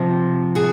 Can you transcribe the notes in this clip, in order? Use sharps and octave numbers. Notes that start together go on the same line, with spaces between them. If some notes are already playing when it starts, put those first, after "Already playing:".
Already playing: C3 F3
F#4 G#4